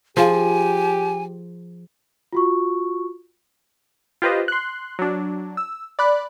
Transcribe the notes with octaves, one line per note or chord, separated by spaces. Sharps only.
F3 G4 G#4 F5 G#5
F4 F#4 C#6
F4 G4 B4 C5 D#5
C6 F#6
F#3 D4
E6
D5 B5 F#6